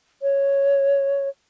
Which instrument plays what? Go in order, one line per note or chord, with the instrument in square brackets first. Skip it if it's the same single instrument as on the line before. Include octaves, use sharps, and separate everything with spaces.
[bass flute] C#5